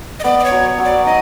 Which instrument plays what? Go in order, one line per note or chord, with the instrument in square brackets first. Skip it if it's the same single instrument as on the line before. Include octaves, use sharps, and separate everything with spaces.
[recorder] D#5
[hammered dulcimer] B3 [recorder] D5
[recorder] D5
C#5
[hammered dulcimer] F#3
F#3
[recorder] D5
[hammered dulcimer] D#4 [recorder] D#5